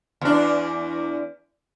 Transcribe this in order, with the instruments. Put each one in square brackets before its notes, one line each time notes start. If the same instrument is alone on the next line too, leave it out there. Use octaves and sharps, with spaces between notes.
[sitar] E2 D4